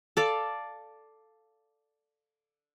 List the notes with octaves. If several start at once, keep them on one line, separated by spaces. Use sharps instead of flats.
A4 D5 F5